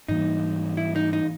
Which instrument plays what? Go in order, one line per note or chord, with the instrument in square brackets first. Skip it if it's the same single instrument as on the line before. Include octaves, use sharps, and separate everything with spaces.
[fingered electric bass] G#2 E3 G3 A#3 [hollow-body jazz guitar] D#4
[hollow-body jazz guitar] E4
D#4
D#4